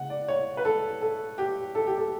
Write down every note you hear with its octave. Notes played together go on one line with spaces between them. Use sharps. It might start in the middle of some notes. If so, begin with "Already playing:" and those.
Already playing: C#3 F#5
D5
C#5
B4
A4
A4
G4
A4
G4
A4